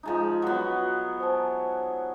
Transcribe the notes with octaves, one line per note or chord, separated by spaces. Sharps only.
F3 G#3 D#4
F#3 B3 F4 F#4
C5 G#5 A5